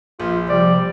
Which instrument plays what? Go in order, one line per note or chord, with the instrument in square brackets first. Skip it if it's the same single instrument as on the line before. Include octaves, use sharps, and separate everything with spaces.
[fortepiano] A#1 [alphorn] F4
[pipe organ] C3 F3 [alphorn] G3 [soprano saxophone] D5